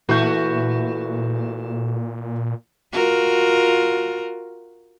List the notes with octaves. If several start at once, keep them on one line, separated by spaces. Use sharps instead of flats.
A#2 E3 A3 F#4 B4 G6
F4 F#4 A#4